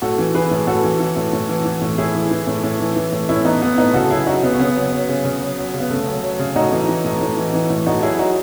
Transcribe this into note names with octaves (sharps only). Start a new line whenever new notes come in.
A2 F#4 A4
E3
E3 G#4 B4
A2
A2 F#4 A4
E3
E3
A2
A2
E3
E3
A2
A2 E4 G#4
E3
E3
A2
A2
E3
E3
A2
A2 C#4 E4
E3 B3 D#4
E3 B3
A2 B3 D#4
C#3 F#4 A4
F#3 E4 G#4
F#3 D#4 F#4
C#3 B3
C#4
C#3 B3
F#3
F#3
C#3
C#3
F#3
F#3
C#3
B3
C#3 A3
F#3
F#3
C#3
A2 D#4 F#4
E3
E3
A2
A2
E3
E3
A2
A2 D#4 F#4
F#3 E4 G#4
F#3 D#4 F#4